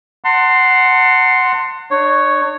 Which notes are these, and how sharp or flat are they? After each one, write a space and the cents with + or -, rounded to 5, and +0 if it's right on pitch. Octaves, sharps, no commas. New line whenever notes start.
F#5 +0 A5 +40 C6 +0
D4 +40 C#5 +0